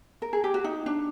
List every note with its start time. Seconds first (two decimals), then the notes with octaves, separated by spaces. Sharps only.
0.22 A#4
0.33 G#4
0.44 G4
0.54 F#4
0.64 D#4
0.86 D4